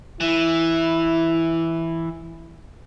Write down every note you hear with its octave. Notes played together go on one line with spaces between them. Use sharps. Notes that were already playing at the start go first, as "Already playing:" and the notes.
E3 E4